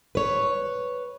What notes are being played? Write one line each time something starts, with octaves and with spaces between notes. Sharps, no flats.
B4 C#5